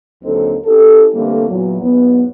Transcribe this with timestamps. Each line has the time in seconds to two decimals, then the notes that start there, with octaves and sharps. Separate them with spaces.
0.24 D#2 D3 F#3 C4 D#4 A4
0.65 C#4 E4 G4 A4
1.13 D3 E3 G3 A3 A#3 C4
1.48 E2 A#2 E3 F#3
1.81 E2 G#2 F#3 B3